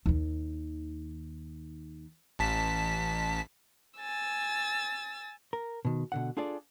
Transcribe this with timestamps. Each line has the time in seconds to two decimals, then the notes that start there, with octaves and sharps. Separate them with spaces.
0.06 D#2 D#3
2.39 A1 A5 B6
4.00 G#5 E6 A6
5.53 A#4
5.85 B2 D#3
6.12 B2 D3 F#5
6.37 D4 F4 G#4 A4 D5